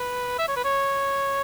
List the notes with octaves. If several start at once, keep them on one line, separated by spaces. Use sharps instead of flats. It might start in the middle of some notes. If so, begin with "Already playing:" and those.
Already playing: B4
E5
C#5
B4
C#5